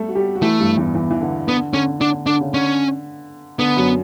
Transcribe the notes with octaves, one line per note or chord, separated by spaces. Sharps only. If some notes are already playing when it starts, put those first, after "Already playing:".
Already playing: G3 A3 A4
F#4
G3 G4
F#4
E3 A3 E4
G2 G3
E2 E3
E2 E3
E3
D3
D3 B3
D3 C#4
D3 D4
D3 D4
C#3
D3 C#4
D3 B3
F#2 F#3